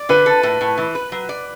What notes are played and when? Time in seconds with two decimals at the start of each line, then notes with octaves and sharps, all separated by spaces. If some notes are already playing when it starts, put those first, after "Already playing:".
Already playing: D5
0.09 D3 B4
0.26 A4
0.43 A2
0.61 A2
0.78 E3
0.95 B4
1.12 F#3
1.29 D5